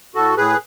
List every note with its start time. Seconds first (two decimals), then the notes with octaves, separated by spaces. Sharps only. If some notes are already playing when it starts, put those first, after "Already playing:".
0.15 A2 F#4 A4
0.37 A2 G#4 B4